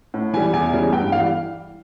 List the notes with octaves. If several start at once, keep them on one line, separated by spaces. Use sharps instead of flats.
A2
E3 G3 G#5
E2 G#5
C#3 E3 G3
G2 G5
E3 G3 F5